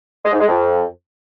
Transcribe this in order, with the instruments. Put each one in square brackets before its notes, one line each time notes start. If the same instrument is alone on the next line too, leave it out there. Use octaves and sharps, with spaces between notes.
[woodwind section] G#3
G#2
G#3
F2